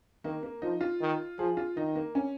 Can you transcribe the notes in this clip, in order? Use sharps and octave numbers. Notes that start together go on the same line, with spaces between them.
D#3 A#3
A#3
F3 D#4
F4
D#3
F3 G#4
F4
D#3 D#4
A#3
C#4